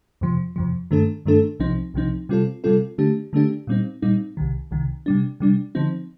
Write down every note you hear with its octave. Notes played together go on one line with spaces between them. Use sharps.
F2 C3 F3
F2 C3 F3
G2 D#3 A3 D4 A4
G2 D#3 A3 D4 A4
C2 C3 F3 C4 D#4
C2 C3 F3 C4 D#4
C3 G3 C4 F4 A4
C3 G3 C4 F4 A4
D3 A3 D4 G4
D3 A3 D4 G4
A#2 G3 C4 D#4
A#2 G3 C4 D#4
C2 C3 D#3
C2 C3 D#3
C3 G3 D4
C3 G3 D4
D3 F3 C4 D#4